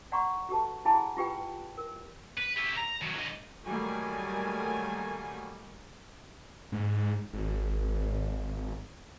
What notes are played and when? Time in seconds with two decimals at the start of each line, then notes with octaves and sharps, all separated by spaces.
0.12 D5 F#5 A#5 C6 C#6
0.49 F#4 G4 A4 B4 A5
0.85 E4 G#4 F#5 G#5 A5 B5
1.17 F4 G4 B4 G5
1.77 A#4
2.37 B4
2.56 E4 G4
2.77 A#5
3.01 D#3 F#3
3.18 G2 D#5
3.65 D#3 F#3 G3 A3 A#3 G#5
6.72 G#2
7.33 G#1